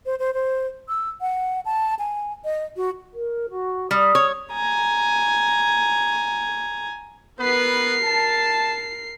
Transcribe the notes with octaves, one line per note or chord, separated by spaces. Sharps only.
C5
C5
C5
E6
F#5
A5
G#5
D#5
F#4
A#4
F#4
G3 D#6
C#5
G#5 A#5
B3 A#4 B4 C7
A5